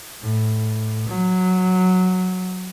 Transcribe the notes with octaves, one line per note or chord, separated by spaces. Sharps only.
A2
F#3